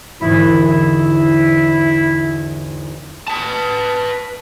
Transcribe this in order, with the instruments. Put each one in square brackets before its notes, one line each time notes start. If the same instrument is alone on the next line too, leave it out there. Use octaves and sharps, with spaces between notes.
[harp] G#1 E2 D3 [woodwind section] E4
[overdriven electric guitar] B4 A5